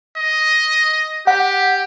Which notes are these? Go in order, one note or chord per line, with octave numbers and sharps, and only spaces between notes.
D#5
G4 F#5